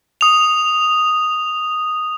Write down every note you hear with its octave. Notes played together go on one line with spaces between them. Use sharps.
D#6 F7